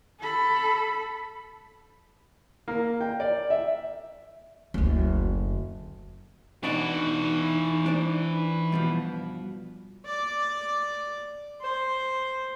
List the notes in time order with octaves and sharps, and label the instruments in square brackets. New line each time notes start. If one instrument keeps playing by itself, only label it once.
[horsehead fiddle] A4 B5
[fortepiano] A#3
G5
D5
E5
[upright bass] F#1 D2
[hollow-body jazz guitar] B2 D4 D5 [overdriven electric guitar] E3 F#4 [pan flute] D#4
[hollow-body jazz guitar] D4 C5 D5
G2 B2 F3
[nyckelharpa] D5 D6
C5